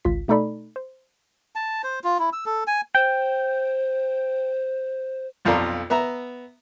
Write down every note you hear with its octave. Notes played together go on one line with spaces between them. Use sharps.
G#1 C#2 F4 B6
B2 A3 D#4 A4 D5 B5
C5
A5
C5
F4
E4
E6
A4
G#5
C5 G5
B1 F2 F4 A4 D5 A#5
B3 E5 A#5